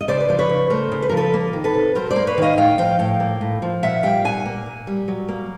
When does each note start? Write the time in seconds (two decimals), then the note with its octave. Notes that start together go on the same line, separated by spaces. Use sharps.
0.01 D#5
0.08 C#3 C5 D5
0.20 B4
0.29 F3 C5
0.39 B4 C#5
0.50 C#3
0.70 A3 A#4 C5
0.92 C#3
1.02 B4
1.09 F3 A#4
1.17 A4 B4
1.34 A#3
1.53 D#3
1.64 A4 B4
1.74 C3
1.95 F#3 A#4 C5
2.11 C5 D5
2.16 A#3
2.27 B4 C#5
2.38 D#3 D#5 F5
2.57 A2 F5 G5
2.78 F3 F5 G5
2.99 A2 F5 G5
3.20 A#3
3.41 A2
3.62 F3
3.83 A#2 E5 F#5
4.03 G3 F5 G5
4.24 A#2 F#5 G#5
4.46 A#3
4.66 A#2
4.87 G3
5.08 F#3
5.29 A#3